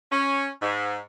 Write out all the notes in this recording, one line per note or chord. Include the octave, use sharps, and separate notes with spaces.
C#4
G#2